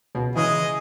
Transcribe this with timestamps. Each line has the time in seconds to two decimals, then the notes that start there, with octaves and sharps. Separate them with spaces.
0.15 C#2 B2
0.36 C#3 E3 G#3 G#4 D#5